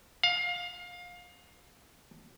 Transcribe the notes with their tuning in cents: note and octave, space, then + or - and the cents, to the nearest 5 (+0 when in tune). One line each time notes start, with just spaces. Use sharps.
F5 +25